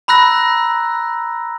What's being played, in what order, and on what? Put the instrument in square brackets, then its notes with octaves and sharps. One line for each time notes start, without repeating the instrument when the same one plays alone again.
[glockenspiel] A#5 B5 E6 F#6 A#6